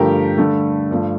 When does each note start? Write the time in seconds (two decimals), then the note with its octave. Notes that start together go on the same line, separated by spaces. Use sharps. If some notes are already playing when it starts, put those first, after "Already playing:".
Already playing: G2 D3 F3 A3 G4 A#4
0.38 G2 D3 A3
0.91 G2 F3 A3